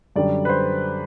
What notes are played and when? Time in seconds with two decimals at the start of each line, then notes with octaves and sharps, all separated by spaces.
0.16 F#2 D3 G3 D5
0.45 B4
0.49 C5